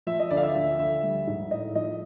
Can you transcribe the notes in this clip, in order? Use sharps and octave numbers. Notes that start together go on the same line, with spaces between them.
F3 E5
D#5
D2 D5
F5
E5
F3 E5
D2 E5
G3
G#2
A2 D#5
F3 D#5